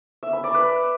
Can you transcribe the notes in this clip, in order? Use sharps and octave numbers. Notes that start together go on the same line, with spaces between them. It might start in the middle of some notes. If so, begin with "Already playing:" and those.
E5
B5
D5
B4